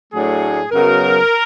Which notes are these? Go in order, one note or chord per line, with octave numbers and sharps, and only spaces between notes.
A2 F#3 A3 D4 G#4
F#2 C#3 F#3 B3 A#4